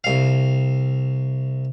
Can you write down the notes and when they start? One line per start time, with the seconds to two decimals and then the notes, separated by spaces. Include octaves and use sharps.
0.04 C2 F5